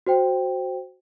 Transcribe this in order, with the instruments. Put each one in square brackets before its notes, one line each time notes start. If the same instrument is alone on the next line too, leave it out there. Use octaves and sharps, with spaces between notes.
[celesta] F#4 C5 G5